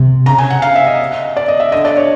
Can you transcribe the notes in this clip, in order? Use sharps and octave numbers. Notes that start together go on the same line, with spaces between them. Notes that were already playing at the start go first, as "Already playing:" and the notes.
Already playing: C3
C#3 A#5
G#5
F#5
F5
E5
D#5
D5
D#5
E5
D3 D#5
D5
C#5